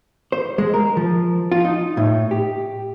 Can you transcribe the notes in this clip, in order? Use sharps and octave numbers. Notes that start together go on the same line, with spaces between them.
C5
G#3
A#4
F3
F4
D#4
A2
G4